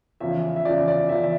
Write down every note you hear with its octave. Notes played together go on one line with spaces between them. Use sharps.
E2 C#3 F3 E5
E5
E2 C#3 F3 D5
D5
E2 C#3 F3 E5
E5